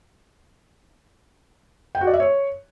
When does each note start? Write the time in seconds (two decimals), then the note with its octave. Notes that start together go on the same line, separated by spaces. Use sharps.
1.95 G5
2.01 F#4
2.07 D5
2.14 E5
2.20 C#5